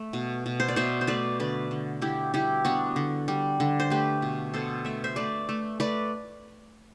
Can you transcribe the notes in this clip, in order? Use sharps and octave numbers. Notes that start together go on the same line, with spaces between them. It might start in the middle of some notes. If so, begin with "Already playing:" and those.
Already playing: A3
B2
B2
C5
D5
B2 C5 E5
C5
A3 B4 D5
D3 B4 D5
D3
D3 E4 G4
G3 E4 G4
B3 D4 F#4
D3
G3
D3
C5
A3 G4 B4
B2
B2 A4 C5
A3 E5
C5 E5
A3 B4 D5
A3
A3 B4 D5